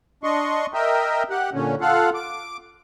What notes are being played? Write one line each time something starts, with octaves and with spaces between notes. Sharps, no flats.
D4 D#5 C6 C#6
A#4 D#5 E5 G5
G4 F#5
A#2 D3 C#4
F4 A4 F5 F#5
D6